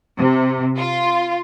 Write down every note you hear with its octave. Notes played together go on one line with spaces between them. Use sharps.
C3
F4